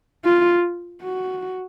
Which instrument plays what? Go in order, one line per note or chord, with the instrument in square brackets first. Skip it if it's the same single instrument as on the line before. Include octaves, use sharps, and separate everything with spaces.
[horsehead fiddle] F4
F#4